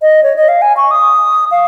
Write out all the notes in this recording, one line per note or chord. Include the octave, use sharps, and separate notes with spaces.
D#5
C#5
D#5
F5
G#5
C#6
D#6
F5